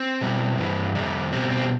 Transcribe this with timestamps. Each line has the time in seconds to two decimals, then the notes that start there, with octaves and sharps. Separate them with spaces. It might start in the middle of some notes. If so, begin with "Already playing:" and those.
Already playing: C4
0.21 B2 G3
0.58 G2 E3 G3
0.95 F2 C3 G3
1.32 B2 G3 C4
1.51 C4